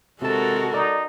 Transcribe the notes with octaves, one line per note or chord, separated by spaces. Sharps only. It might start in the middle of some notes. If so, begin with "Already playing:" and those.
C3 G#3 F#4 A4 A#4 A5
D#4 D5